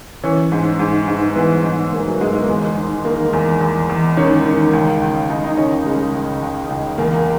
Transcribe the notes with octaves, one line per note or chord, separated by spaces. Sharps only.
E3 C#4
G#2
G#2
G#2
E3 B3
G#2
G#2 A#3
F#3
G#2 G#3
B3
A#3
E2 G#3
D#3
D#3 A#3
E2
E2
E2
D#3 C#4
D#3
C#2
C#2
C#2 D#4
D#4
C#2 C#4
C#3 G#3
C#2
C#2
C#2
E2 A#3